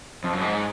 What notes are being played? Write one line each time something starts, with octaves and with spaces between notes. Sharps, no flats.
F2
F#2
G#2